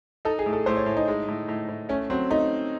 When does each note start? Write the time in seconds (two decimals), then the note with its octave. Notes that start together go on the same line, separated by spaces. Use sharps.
0.25 D#4 A4
0.39 G#4
0.46 A2
0.53 A4
0.66 A2 C5
0.77 C#5
0.86 A2
0.97 D#4
1.08 G#3
1.28 A2
1.48 A2
1.69 A2
1.89 A3 C#4
2.10 F#3 C4
2.30 A3 D#4